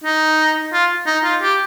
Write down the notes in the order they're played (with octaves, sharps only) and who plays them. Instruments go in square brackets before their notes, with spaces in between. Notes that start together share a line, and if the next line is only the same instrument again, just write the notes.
[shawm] D#4
F4
D#4
F4
G4